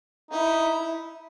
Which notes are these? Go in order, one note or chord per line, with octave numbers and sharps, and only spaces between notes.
D#4 E4